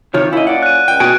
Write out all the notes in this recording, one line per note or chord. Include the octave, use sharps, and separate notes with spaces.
C3 D#3 F4 C#5
A#3 C#4 E4 F4 D#5
D5 F#5
F#6 D#7
C#2 G5
B2 F#4 G#5 D7